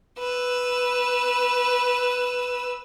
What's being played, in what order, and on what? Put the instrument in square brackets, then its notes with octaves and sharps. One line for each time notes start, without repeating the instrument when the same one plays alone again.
[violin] B4 E6